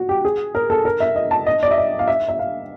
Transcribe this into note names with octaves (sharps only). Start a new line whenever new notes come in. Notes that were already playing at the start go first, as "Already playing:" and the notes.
Already playing: F#4
G4
G#4
A#4
A4
A#4
E5
D#5
A5
D#5
D5
E5
D#5
F5
E5
E5
F5